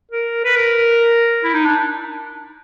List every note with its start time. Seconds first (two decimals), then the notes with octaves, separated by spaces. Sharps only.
0.12 A#4
0.44 B4
0.56 A#4
1.44 E4
1.53 D#4
1.66 D4